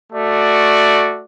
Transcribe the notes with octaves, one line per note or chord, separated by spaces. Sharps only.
A3 F#4 D5